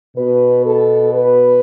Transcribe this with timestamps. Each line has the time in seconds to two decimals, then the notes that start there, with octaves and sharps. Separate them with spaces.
0.17 B2 B4
0.65 A4
1.13 B4